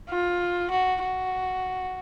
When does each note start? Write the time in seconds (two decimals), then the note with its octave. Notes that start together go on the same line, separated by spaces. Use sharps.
0.09 F4
0.71 F#4
1.02 F#4